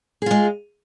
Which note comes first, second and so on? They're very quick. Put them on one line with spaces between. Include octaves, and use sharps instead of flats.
G#4 F4 G#3